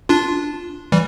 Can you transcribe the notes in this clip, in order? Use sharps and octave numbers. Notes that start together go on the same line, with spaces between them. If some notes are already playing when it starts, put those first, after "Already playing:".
D4 F4
E3 G3